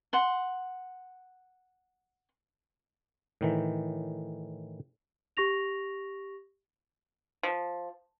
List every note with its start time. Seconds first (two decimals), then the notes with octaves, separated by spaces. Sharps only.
0.13 F#5 C6
3.41 A2 D#3 E3
5.37 G4 C#6 A#6 F7
7.43 F3